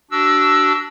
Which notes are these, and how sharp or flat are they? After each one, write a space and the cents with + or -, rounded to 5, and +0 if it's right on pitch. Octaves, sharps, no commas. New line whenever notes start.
D4 +0 F#4 +35 E6 +0